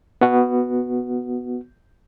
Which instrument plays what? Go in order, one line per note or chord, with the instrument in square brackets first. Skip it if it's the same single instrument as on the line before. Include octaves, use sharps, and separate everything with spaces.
[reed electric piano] B3 F#4